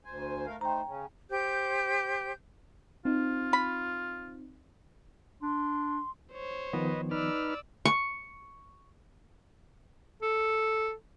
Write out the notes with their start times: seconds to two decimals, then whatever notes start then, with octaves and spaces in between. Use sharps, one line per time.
0.05 D2 C5 G#5
0.46 A3 A#4 F5
0.61 A3 D#4 C5 G5 A#5
0.86 C#3 C#4
1.31 G4 C5 G6
3.05 C4 D#4 F4
3.53 B5
5.42 D4 C6
6.32 C5 C#5
6.73 D#3 F3 B3 B4 D#5
7.11 D#4 B4 D5 E6 F6
7.85 C#6
10.22 A4